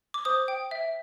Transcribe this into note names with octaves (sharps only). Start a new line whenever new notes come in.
D6
C5 D#6
G5
E5